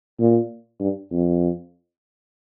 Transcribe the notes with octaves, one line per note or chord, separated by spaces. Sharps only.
A#2
G2
F2